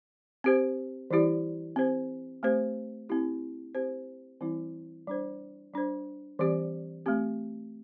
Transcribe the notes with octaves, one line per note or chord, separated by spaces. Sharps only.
C4 G4 C5
E3 G3 E4 G4 D5
C4 G4 C5
A3 C4 G4 C5
C4 E4 G4
C4 G4 C5
E3 G3 C4 E4
G3 D4 C5
G3 D4 C5
E3 G3 C4 G4 D5
A3 C4 G4